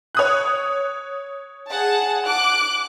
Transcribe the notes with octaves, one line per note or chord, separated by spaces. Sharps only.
C#5 D#6 F#6
G#4 F#5 A5
D6 F#6